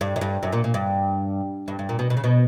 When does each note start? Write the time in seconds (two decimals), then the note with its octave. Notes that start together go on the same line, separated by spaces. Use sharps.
0.01 G2
0.16 F#2
0.21 G2
0.43 F#2
0.53 A#2
0.64 A#2
0.74 G2
1.68 G2
1.79 G2
1.89 A#2
1.99 B2
2.10 B2
2.17 C#3
2.24 B2